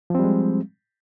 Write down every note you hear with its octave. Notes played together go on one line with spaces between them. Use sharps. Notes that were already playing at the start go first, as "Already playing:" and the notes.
F3 G3 G#3 C4